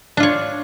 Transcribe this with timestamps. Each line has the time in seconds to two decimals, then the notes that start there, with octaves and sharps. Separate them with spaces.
0.17 D4
0.20 F4
0.23 C#5